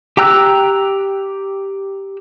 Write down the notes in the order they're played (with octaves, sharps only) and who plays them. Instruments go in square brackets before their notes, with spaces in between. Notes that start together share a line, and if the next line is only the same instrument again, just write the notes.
[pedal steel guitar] G4 G5 A#5 E6 F#6